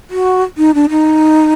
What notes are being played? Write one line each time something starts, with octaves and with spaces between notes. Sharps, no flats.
F#4
D#4
D4
D#4